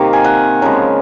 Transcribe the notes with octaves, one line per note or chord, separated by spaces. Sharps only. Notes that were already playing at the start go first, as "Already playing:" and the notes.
Already playing: C3 D#3 A#3 D#4 F5
G#5
F#5
C#3 F3 G#3 A#5